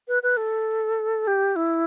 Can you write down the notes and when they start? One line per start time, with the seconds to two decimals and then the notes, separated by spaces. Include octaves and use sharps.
0.08 B4
0.23 B4
0.37 A4
1.27 G4
1.56 E4